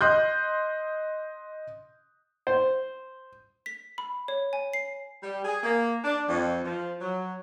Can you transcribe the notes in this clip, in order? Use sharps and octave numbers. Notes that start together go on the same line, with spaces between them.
D#5 C6 F#6 G6
C5
B6
B5
C#5
G#5
C7
G3
G#4
A#3
D4
F2
F3
F#3